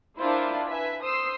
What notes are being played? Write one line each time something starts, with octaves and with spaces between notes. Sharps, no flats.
D4 E4 F4 A#4 C5 E5
B4 E5 G#5 B6
C5 C6 D#6 E6 C7